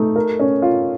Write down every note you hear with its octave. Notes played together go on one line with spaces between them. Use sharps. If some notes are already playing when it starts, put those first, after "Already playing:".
Already playing: A3 D#4
A#4
C#4
F4